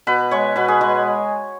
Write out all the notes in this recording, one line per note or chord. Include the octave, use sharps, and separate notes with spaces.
B2 B4
G#3 C#5
B2 B4
G#4
G#3 B4